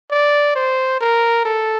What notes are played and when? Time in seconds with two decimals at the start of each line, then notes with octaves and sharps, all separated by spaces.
0.11 D5
0.55 C5
1.00 A#4
1.45 A4